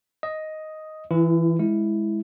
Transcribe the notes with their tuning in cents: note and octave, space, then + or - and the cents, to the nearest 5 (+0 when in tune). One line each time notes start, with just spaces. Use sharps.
D#5 +5 D#6 +5
E3 +0 E4 +40
G#3 +0 E4 -5